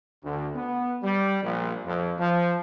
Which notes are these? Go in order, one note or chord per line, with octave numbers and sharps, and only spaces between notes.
D2
B3
G3
A#1
F2
F3